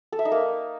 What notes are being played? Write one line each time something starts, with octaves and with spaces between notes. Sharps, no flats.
A4
E5
D#4
A#3